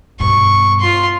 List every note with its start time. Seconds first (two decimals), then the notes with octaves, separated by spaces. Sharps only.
0.20 G2 B2 C#6
0.80 F4 C6